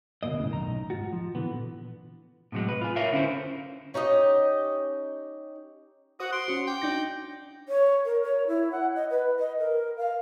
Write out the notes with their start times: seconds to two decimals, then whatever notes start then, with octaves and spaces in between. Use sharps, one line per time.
0.23 D2 G#2 B2 A#3 D#5
0.38 F#2 A2 C#3
0.50 B1 D#3 D#4 A#5
0.90 G#2 C3 F4 F#4
1.13 F3
1.35 A#2 D3 E3 B3
2.52 A2 C3 F#3 G#3
2.69 B4
2.81 F4 G#5
2.96 A#4 C#5 E5 F5
3.12 D3 C#4 E4 C5
3.94 C#4 D#4 G4 D#5
6.20 F#4 C5 F#5 D#6
6.32 C6 D7
6.48 C#4 F#4 C#7
6.67 G5 D6
6.82 D4 D#4 G6 A#6
7.69 C#5
8.05 A#4
8.23 C#5
8.48 E4
8.72 F#5
8.96 D#5
9.10 B4
9.39 D#5
9.59 A#4
9.97 F5